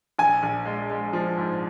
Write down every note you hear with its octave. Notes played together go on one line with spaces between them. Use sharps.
A#1 G#5
A#1
G#3
G#3
F3
G#2